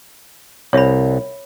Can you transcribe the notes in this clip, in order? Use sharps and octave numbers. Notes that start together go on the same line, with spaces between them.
C2 C#5 E5 B5